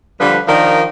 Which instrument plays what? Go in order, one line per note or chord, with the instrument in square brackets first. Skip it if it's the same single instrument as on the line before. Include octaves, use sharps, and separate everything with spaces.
[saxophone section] D3 F3 G3 B4
D#3 F3 D4 A#4